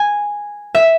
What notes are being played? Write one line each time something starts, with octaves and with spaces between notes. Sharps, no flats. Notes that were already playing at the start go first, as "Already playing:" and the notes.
Already playing: G#5
E5